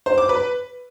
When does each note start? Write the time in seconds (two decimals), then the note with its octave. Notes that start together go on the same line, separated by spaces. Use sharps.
0.06 C5
0.18 D6
0.29 B4